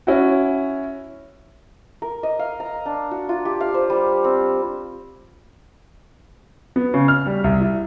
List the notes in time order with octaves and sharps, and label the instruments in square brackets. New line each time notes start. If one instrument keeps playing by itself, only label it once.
[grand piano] C#4 E4 F#4
[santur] A#4
D#5
F5
A#5
D4
F#4
F4
G4
F5
C5
G3
C4
[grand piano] B3
C#3
F6
G3
C2
E4